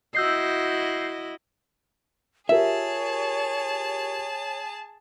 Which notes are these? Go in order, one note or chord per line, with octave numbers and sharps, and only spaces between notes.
E4 F#4 D#5 E6 G6 C7
F4 G4 G#4 A#4 C#5 E5 A5